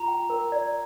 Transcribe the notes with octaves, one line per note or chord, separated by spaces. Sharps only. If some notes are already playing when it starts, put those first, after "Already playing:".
Already playing: F4 A#5
G5
A#4
D5